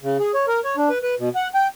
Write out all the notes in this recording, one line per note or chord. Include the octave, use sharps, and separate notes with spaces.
C#3
G#4
C#5
A#4
C#5
D4
B4
B4
B2
F#5
G5